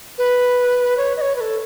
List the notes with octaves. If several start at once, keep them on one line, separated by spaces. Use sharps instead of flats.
B4
C#5
D#5
C#5
B4
A4